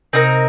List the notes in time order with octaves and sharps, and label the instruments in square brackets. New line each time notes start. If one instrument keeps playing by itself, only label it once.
[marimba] C3 [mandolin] C4 D#4 A#4